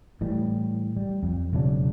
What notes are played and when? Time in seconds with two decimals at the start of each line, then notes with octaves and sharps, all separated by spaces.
0.21 A2 E3 G3
0.97 G3
1.23 F2
1.53 E1 C#3 F#3 D4